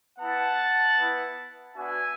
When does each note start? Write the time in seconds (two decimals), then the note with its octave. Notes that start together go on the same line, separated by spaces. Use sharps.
0.19 B3 E4 F#5 A5
0.97 B3 E4
1.75 B3 D4 F#4 E5 G#5